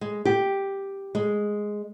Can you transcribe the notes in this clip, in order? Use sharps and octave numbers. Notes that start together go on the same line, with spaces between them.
G#3
G4
G#3